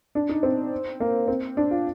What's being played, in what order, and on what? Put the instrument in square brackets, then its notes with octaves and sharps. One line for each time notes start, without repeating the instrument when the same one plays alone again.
[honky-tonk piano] D4
D#4
C4
A#3
C4
D4
F4